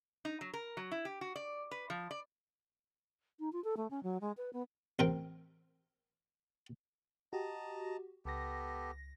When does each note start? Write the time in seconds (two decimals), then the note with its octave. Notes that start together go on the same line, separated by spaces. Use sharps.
0.25 D#4
0.41 F#3
0.53 A#4
0.77 F#3
0.91 E4
1.05 G4
1.21 F#4
1.36 D5
1.71 B4
1.90 F3
2.11 D5
3.39 D#4
3.52 F4
3.64 A4
3.77 A3
3.90 C#4
4.03 F#3
4.21 G#3
4.37 B4
4.53 B3
4.99 A1 C4 A#4 G5
7.33 F#4 G4 D#5 A5 A#5
8.25 C#2 B3 G4 A4 A#6